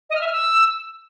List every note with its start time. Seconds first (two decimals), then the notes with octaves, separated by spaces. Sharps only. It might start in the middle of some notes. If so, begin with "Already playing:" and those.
0.10 D#5
0.15 F6
0.21 E5
0.26 F6
0.32 E6